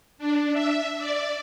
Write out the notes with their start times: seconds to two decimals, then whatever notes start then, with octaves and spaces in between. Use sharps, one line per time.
0.18 D4
0.53 E5
0.98 D5